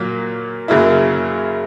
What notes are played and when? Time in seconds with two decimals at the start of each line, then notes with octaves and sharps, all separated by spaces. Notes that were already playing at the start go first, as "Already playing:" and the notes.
Already playing: A#2 F#3 A#3
0.68 F#2 C#3 F#3 A#3 E4